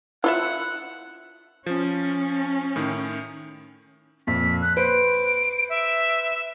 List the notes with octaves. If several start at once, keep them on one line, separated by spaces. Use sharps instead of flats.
E4 F4 E5 F#5
F3 C#4
A2 D#3
F2 A#2 B6
F#6
B4 C5 D7
E5